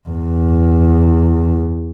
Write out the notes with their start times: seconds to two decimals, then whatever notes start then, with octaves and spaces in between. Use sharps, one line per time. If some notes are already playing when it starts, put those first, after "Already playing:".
0.09 E2